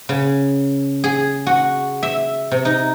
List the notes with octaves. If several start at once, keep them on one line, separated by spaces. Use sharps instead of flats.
C#3
G#4
F#4
E5
C3
D#4